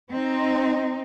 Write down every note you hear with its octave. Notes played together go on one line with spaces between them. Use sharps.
C4 D#4